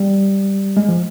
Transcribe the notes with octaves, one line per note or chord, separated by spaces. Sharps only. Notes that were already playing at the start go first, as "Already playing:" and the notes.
Already playing: G3
G#3
F3